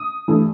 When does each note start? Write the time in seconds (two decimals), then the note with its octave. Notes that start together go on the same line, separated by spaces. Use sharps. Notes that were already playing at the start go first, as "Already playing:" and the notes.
Already playing: D#6
0.28 G2 E3 A3 E4